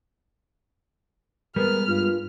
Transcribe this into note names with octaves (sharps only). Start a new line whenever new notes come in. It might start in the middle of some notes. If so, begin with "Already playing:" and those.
G3 G#3 B3 A#4 B4 F6
G2 F4